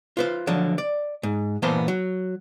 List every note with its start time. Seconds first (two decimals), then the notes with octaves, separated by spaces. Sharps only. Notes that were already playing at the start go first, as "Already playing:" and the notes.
0.17 F4 B4 C5
0.47 D3 F3 F#3
0.78 D5
1.23 G#2
1.62 A#2 E3 A#3 B3 C5 A5
1.88 F#3